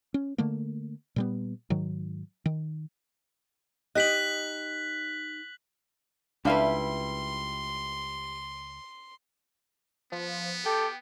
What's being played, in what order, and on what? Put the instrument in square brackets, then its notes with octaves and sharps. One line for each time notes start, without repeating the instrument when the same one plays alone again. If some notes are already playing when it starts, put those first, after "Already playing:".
[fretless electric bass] C#4
D3 A3 A#3
A#2 G3 B3
G#2 D#3 F#3
D#3
[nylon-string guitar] D#4 G4 D#5 [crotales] F#6 B6 F#7
[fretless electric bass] C#2 [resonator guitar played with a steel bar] G3 E4 B4 [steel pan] D4 F5 [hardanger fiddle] C6
[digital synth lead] F3 [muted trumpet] B3
[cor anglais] G4 [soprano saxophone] A4 [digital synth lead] G5